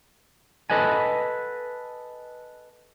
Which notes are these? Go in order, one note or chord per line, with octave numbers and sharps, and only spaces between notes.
A4 B4 D#5 F#5 G#5